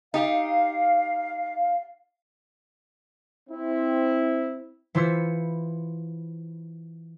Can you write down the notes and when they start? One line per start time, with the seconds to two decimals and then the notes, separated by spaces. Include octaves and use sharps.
0.14 D#4 G4 F5
3.49 C4 E4
4.95 E3 E4 F4 C5 E6 C#7